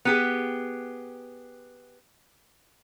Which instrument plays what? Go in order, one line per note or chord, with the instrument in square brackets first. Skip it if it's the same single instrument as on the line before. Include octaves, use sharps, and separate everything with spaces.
[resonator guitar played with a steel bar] B3 G4 G#4